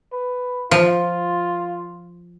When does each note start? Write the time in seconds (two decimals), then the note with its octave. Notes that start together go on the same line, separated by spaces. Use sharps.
0.13 B4
0.71 F3 F4